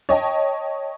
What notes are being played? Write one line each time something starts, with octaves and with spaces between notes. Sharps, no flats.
C#5 D#5 G5 A5